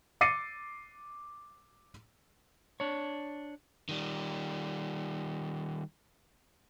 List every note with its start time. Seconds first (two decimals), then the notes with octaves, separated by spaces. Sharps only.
0.21 D6 A6 C7 C#7 D#7
2.80 D4 C#5
3.89 D#3 G3